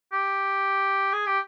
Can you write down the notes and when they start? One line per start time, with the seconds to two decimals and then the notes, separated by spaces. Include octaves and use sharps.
0.13 G4
1.13 G#4
1.26 G4